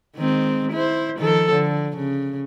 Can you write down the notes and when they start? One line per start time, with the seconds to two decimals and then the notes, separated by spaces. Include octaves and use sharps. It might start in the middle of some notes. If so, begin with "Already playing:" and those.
0.16 D#3 G#3 C4
0.72 E4 C5
1.18 D#3 F3 A4
1.52 D3
1.96 C#3